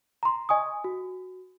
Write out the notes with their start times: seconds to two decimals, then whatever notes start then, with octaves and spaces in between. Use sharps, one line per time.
0.23 A#5 C6
0.49 D#5 G#5 C#6 D#6
0.84 F#4